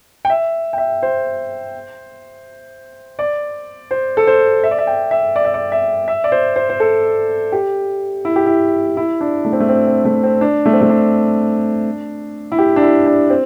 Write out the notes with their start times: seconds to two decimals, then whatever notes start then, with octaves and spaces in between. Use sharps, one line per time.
0.25 G5
0.30 E5
0.73 G5
0.78 E5
1.02 C5
3.19 D5
3.91 C5
4.17 A4
4.27 C5
4.64 E5
4.71 D5
4.78 E5
4.87 G5
5.11 E5
5.36 D5
5.45 E5
5.54 D5
5.72 E5
6.08 E5
6.24 D5
6.32 C5
6.56 C5
6.70 C5
6.80 A4
7.52 G4
8.25 E4
8.36 G4
8.46 E4
8.97 E4
9.21 D4
9.45 A3
9.53 C4
9.60 A3
9.69 C4
9.87 C4
10.05 A3
10.23 C4
10.41 D4
10.66 A3
10.73 C4
10.81 A3
10.90 D4
12.52 E4
12.58 G4
12.76 D4
12.82 E4
13.06 D4
13.30 C4